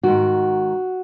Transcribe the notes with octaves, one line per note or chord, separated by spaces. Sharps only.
G#2 D#3 F#4